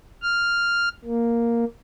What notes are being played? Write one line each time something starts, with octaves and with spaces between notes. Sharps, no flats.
F6
A#3